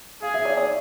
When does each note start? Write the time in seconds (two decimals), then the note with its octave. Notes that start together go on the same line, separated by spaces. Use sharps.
0.22 G#4 F5
0.34 E5
0.45 D5
0.57 D5